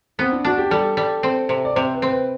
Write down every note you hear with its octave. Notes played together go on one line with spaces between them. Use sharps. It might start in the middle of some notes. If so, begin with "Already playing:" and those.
B3 C4
D4
D4 F#4
G4
G3 A4
G3
C4
C3
D5
C3 C5
B4
C4
B4